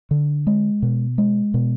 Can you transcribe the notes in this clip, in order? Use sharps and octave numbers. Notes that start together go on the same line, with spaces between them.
D3
G#3
B2
G#3
B2